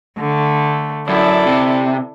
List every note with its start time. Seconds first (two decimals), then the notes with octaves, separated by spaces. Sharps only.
0.19 D3 A3
1.09 F#2 E4 A4 D5
1.46 C3